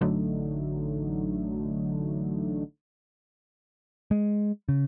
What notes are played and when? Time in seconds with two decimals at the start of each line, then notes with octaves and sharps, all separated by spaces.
0.01 A1 D3 F#3 A3 D#4
4.11 G#3
4.69 C#3